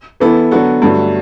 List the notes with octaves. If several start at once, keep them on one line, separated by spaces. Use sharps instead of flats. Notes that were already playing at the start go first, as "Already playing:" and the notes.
E3 B3 E4 A4
D3 F#3 B3 F#4 A4
G2 D3 F#3 A3